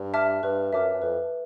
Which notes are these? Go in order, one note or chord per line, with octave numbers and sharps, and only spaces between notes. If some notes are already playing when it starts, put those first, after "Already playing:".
Already playing: G2
E5 A5 D6 F6
G2 B4
F#2 E5 A5 D6 F6
F#2
F2 B4